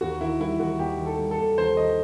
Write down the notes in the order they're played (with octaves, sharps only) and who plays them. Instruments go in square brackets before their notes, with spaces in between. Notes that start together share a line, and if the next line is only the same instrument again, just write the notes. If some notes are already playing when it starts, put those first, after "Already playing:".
[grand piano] D#2 F#4
D#3 E4
G3 E4
D#2 F#4
D#2 G4
D#3
A4
G3
A4
D#2
D#2 C5
D#3 D#5